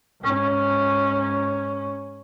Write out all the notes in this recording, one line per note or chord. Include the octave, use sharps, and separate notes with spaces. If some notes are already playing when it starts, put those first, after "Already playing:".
G#2 C#4